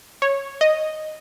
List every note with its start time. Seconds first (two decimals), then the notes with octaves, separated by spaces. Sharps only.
0.22 C#5
0.61 D#5